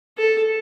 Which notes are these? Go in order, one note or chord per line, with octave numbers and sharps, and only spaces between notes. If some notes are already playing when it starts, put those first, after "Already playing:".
A4